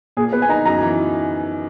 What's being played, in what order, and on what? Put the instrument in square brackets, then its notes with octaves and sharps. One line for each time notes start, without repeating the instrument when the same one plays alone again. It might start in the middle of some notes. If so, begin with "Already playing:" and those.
[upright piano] A#2 [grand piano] G#4
[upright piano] B3 [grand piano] B4
[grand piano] G#5
[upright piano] D#4 [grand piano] A#5
[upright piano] F#2 [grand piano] A#5
[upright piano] E3